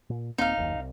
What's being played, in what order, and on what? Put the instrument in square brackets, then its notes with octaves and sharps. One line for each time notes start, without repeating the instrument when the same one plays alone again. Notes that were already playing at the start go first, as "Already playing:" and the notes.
[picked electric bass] A#2
[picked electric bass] D#1 A#3 C4 [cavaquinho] D#4 F5
[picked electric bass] F#1 D#2
C2